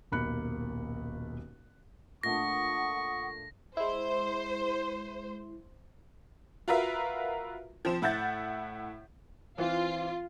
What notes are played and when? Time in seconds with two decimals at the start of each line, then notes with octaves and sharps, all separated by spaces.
0.12 D#1 B1 A#3 B5 F#6 C#7
2.23 A#2 A3 D4 F#5 C#6 D#6 A#6
3.77 G#3 E4 C5
6.68 F4 F#4 A#4 B4 E5 F5
7.85 F3 C4 C5 E7
8.02 A2 E4 F#5 G6 A6
9.58 E3 C4 F4